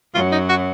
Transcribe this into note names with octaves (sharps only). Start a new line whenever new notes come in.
F#2 F#3 F4
D#4
F#4